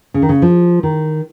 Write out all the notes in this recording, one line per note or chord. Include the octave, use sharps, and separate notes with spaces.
C#3
D#3
C#3
F3
D#3